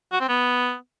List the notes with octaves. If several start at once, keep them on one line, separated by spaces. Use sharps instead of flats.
F#4
C4
B3